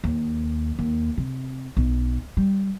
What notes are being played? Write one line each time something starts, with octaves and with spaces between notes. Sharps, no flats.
D#2
D#2
C3
B1
G3